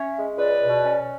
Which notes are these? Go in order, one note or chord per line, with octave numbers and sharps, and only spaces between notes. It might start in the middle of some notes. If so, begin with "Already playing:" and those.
Already playing: C#4 C#5 E5
G#3
C#2 B4 D5
B2
C#4